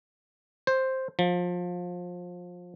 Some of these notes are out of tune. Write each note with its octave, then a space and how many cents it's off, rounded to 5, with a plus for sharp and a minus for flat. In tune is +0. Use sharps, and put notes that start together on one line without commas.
C5 +5
F3 +25